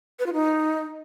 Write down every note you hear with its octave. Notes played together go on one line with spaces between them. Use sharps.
B4
F4
D#4